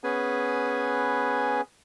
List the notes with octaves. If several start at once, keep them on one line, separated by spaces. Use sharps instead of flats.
B3 C#4 G#4 B4 G#5